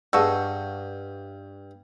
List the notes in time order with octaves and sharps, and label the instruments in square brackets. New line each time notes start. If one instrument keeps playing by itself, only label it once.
[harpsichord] G2 [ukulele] G#4 D#5 F#5 [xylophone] A5 C#6 E6